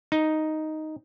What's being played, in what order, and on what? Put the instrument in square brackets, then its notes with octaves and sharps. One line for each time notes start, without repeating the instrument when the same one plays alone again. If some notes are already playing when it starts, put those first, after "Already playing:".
[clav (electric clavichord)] D#4